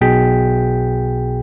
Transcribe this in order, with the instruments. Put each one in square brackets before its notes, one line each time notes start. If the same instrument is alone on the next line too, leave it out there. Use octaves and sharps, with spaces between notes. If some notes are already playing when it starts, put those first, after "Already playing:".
[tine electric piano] B1 B2 G#4 G5 B6